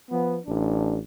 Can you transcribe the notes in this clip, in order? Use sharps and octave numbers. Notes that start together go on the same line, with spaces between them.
F3 B3
A1 D4